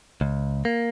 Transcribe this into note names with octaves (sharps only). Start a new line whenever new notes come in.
C#2
A#3